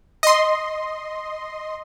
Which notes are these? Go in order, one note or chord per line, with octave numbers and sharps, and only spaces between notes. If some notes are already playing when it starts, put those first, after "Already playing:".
D#5 C6